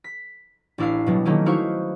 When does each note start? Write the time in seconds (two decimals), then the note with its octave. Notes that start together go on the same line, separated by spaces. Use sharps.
0.04 B6
0.78 A1 D4 E4 F5 C7
1.06 B2 F#3 G3
1.25 D#3 F#3 A3 A#3 C#4
1.46 D#4 E4 F#4 C5 F5 C#6